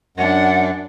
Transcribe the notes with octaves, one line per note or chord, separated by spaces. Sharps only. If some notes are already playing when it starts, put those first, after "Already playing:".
F#2 D4 F#5